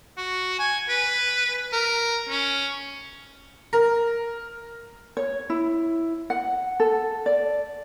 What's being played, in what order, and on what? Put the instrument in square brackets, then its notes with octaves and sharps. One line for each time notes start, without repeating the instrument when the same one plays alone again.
[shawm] F#4
G#5
B4
A#4
C#4
[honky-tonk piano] A#4
[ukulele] C#5
E4
F#5
A4
D5